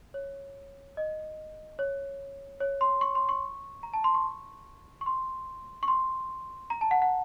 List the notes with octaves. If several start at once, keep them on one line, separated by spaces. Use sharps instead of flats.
C#5
D#5
C#5
C#5
C6
C#6
C6
C#6
A#5
A5
C6
C#6
C#6
C6
C#6
C6
A#5
A5
F#5
F#5